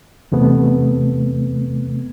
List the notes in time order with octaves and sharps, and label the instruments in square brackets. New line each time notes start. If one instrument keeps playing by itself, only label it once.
[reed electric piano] E2 C3 A3 B3